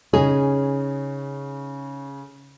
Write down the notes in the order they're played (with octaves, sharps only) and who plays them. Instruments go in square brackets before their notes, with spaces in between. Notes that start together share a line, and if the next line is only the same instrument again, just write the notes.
[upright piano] C#3 [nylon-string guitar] C#4 D#4 G#4